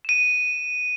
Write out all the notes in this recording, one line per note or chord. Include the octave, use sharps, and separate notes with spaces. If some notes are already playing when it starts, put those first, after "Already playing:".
D#7 E7